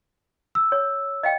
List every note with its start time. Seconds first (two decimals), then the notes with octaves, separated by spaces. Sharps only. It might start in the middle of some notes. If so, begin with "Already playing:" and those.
0.55 E6
0.72 C#5
1.23 D#5 F5 G5